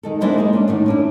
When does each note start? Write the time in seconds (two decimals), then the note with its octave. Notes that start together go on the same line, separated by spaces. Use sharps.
0.03 D#3 G#3 A4
0.21 G#3 A#3 D4 E4 C5 F#5
0.38 G#3 A#3
0.53 C#4 D4
0.68 A2 D3 D#3
0.86 C#4 D4 E4